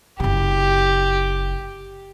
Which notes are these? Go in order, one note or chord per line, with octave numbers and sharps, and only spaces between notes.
F#1 C#3 G4